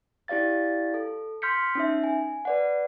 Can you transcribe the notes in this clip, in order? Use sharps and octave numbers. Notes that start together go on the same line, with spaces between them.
E4 G4 D5 F5 A6
A4
C6 F6 G6 B6 C#7
C#4 D#4 E5
G#5
B4 D5 F#5